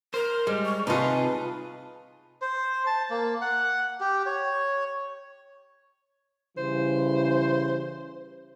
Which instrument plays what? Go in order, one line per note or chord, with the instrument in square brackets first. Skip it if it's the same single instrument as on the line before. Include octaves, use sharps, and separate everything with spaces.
[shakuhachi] A#4 [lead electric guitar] C5 [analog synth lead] F6
[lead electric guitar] G3 [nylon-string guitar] G#3
[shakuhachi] C#6
[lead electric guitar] C3 G#4 [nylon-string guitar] D#4 F4 [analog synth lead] B4 [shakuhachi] A5
[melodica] C5
A5
A#3
F#5
G4
C#5
[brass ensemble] C#3 E3 G3 [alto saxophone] C5